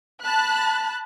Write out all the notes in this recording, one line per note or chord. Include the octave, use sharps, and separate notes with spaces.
A5 B5 F#6